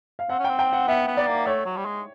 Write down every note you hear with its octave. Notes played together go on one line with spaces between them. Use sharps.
F5
C4 F#5
C#4
C4 G5
G5
F#5
B3 E5
B3
D5
A#3
A3 C#5
F#3
G3
G#3